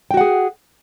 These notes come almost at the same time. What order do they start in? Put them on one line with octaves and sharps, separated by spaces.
G5 F#4 F#5 G#4